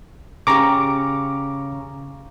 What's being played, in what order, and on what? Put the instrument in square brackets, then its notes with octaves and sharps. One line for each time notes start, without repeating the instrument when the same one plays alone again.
[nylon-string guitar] C#3 G4 [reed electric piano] A#5 C#6 D6